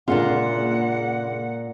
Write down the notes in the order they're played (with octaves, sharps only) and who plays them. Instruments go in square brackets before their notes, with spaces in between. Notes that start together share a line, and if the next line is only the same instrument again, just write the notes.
[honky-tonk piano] F#1 D3 [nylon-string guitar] A#2 G#3 F4 [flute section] F#5